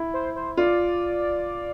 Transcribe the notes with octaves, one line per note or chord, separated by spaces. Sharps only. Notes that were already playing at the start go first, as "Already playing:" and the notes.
Already playing: E4
C5
C5
F4 D5